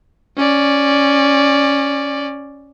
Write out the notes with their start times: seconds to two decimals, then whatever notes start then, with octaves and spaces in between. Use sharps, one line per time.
0.37 C#4 D5